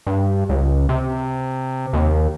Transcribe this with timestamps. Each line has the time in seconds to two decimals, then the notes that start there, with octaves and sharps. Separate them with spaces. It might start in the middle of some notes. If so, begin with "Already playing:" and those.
0.07 G2
0.49 C#2
0.89 C3
1.93 D#2